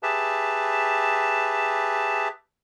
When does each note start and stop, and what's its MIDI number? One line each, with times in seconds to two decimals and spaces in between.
0.03 2.28 67
0.03 2.28 68
0.03 2.28 71
0.03 2.28 76
0.03 2.28 81